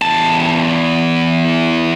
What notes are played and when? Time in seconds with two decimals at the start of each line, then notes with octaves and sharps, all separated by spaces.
0.02 E2 A5